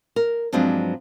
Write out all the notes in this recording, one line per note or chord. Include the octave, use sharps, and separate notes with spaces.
A#4
G2 F3 F#3 G#3 C4 D4